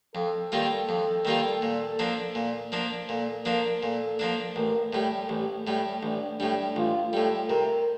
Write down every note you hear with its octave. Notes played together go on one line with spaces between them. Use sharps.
F2 A4
D#3 G3 A#3 F4
F2
D#3 G3 A#3 F4
A#2
F3 A#3 D4
A#2
F3 A#3 D4
A#2 A4
F3 A#3 D4 A#4
A#2 A4
F3 A#3 D4
A1 A#4
A2 G3
A1 G4
A2 G3
A1 D4
A2 G3 D4
A1 F4
A2 G3 A4
C3 A#4